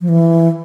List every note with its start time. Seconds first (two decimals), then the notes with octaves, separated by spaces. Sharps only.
0.01 F3
0.09 E3